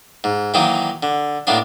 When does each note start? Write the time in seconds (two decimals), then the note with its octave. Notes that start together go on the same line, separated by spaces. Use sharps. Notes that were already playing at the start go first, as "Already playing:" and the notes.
0.24 G#2
0.54 D#3 E3 F#3 A#3 D#4
1.03 D3
1.47 A2 A#3 B3 D4